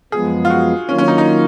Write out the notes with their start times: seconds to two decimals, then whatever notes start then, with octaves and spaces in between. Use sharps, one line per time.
0.12 F#2 F3 G#3 B3 G#4
0.45 F4
0.50 F#4
0.88 D#3 F#3 A#3 C#4 F4
0.98 C#4
1.08 D#4
1.18 D#4